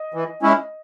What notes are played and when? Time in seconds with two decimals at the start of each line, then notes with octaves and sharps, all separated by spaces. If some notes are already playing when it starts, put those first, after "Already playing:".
Already playing: D#5
0.14 E3
0.43 G#3 C#4 E4